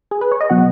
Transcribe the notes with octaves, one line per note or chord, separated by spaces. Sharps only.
G#4
B4
C#5
D#5
B2 F#3 B3 F#5